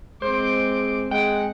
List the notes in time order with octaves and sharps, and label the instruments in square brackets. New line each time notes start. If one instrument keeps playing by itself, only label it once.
[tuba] G#3 [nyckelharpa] C4 D6 [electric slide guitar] C5
[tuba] G#3 [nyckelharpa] F#5 [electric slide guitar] G5